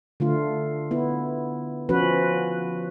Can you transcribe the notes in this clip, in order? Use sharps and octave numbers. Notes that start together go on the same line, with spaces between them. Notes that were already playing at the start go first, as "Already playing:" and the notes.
D3 A3 F4
B3 E4
F3 C#4 F#4 B4